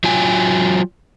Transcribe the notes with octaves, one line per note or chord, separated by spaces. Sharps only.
F#3 F4 G5 G#5